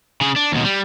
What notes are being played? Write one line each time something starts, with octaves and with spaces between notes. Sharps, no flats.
C#3 G#4
D4
D#2 B2
G3